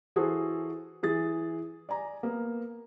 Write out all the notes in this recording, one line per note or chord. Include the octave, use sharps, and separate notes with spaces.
E3 F#4 G#4 A4 C5
E3 G#4 A6
D5 G#5 A#5
A#3 B3